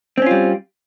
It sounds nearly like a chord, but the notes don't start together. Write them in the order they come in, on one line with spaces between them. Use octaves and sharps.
C4 C#4 F4 G3